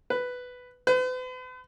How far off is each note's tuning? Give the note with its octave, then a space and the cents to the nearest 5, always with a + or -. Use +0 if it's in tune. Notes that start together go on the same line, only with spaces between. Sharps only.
B4 +5
B4 +45